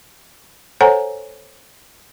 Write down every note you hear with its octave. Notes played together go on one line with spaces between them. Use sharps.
A4 C5 C#5 F#5 G#5 A#5